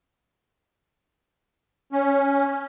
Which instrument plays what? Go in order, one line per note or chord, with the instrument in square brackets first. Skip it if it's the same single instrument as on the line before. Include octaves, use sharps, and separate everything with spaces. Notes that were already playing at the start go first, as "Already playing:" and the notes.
[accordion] C#4